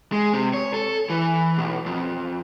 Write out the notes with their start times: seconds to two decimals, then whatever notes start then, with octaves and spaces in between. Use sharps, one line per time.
0.12 G#3
0.33 C3
0.54 C#5
0.74 A4
1.10 E3
1.58 B1
1.86 F2